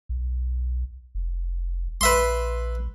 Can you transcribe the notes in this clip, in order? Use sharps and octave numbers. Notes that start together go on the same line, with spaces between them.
B1
F1
A#1 B4 E5 C6